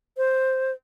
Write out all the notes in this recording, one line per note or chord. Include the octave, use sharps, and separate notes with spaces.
C5